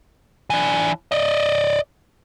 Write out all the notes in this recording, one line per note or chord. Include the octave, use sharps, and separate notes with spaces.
E3 D4
D5 D#5